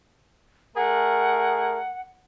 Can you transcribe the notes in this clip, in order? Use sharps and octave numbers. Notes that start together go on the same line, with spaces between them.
A3 G#4 A#4 F#5